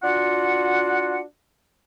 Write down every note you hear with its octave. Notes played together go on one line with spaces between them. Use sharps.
D4 F4 F#4 F#5